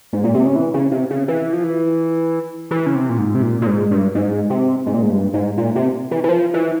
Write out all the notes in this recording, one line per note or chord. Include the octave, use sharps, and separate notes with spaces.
G#2
A#2
C3
C#3
E3
C#3
C3
C#3
E3
F3
E3
E3
C#3
C3
A#2
G#2
C3
A#2
A#2
G#2
G2
G#2
C3
G#2
A#2
G#2
G2
G#2
A#2
C3
E3
E3
F3
E3